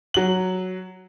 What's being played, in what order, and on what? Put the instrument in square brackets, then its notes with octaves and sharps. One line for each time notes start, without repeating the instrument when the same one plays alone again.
[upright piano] F#3 F#7